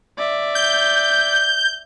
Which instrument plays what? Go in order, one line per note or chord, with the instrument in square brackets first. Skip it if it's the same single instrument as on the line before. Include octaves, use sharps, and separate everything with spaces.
[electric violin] D5 E5
[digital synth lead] G6